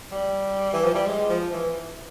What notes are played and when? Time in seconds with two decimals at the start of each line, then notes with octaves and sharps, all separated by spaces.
0.12 G3
0.73 E3
0.84 F3
0.94 G3
1.06 G#3
1.29 F3
1.53 E3